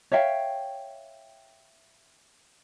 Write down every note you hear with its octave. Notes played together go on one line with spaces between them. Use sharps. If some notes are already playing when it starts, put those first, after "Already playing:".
C#5 E5 F5 G5